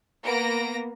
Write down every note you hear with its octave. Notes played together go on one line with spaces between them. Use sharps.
A#3 B3 A#6 D7